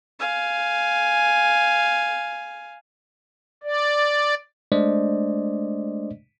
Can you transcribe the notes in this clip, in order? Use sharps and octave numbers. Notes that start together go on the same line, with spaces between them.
F5 G#5
D5
G#3 A3 D4 C5 D5 D#5